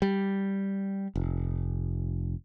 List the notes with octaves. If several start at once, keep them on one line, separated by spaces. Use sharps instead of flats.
G3
F1